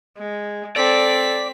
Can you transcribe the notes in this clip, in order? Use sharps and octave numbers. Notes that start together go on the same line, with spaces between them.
G#3
C4 A4 D5 B6